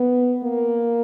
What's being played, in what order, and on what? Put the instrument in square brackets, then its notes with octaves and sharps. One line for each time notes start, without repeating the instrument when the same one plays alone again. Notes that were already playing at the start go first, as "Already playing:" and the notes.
Already playing: [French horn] B3
A#3